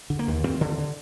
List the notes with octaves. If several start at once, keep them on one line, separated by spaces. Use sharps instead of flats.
D3
A#3
D#2
D#2 C4
D3
D3